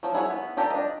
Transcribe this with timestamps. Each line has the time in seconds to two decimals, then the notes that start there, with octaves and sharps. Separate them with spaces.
0.03 F3 F#3
0.15 E4 G#4 C#5 F#5
0.30 B3
0.57 D4 F4 G4 A4 A#4
0.70 D4 D#5